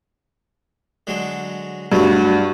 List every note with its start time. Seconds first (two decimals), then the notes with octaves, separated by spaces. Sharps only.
1.07 D3 F#3 G#3
1.92 G2 F#3 A3 F#4